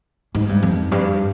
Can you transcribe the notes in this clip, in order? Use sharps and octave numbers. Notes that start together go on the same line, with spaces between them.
G#2
G2
F2
G2